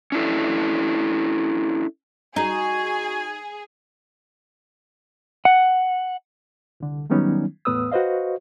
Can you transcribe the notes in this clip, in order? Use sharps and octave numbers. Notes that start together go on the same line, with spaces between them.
C#4 D4 E4 A4
D#4 F#4 G#4 G#5
F#5
C2 D3
D#3 F#3 G3 B3 C#4 D#4
E2 A2 B3 B4 D#6 E6
F#4 B4 C5 D#5 F5